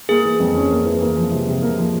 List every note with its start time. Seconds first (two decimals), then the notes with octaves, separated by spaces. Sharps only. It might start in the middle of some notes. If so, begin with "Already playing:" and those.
0.09 A#3 G#4
0.24 E3
0.40 F2
0.55 C#4
0.70 A#3
0.86 E3
1.01 A#3
1.17 F3
1.31 C3
1.47 C3
1.62 A#3
1.78 F3